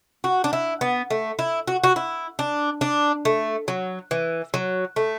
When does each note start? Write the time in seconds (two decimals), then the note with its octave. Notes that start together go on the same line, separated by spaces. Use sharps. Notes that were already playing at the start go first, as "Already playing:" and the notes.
0.24 F#4
0.44 D4
0.53 E4
0.81 B3
1.10 A3
1.39 E4
1.67 F#4
1.84 F#4
1.96 E4
2.39 D4
2.81 D4
3.25 A3
3.68 F#3
4.11 E3
4.54 F#3
4.96 A3